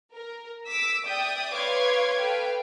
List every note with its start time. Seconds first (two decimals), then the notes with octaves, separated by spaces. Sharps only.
0.14 A#4
0.68 D6 E6 B6
1.06 D5 E5 G5 D#6 G6
1.54 B4 C#5 F5 C6 D6 G#6
2.20 A4 B4 F5 G5